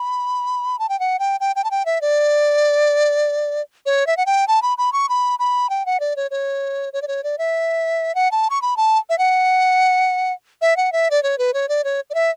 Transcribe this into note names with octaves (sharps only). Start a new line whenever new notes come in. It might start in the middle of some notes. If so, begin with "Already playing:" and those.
Already playing: B5
A5
G5
F#5
G5
G5
G5
A5
G5
E5
D5
C#5
E5
F#5
G5
A5
B5
B5
C#6
B5
B5
G5
F#5
D5
C#5
C#5
C#5
D5
C#5
D5
E5
F#5
A5
C#6
B5
A5
E5
F#5
E5
F#5
E5
D5
C#5
B4
C#5
D5
C#5
D5
E5